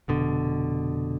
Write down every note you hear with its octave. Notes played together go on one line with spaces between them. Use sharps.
F1 B2 D3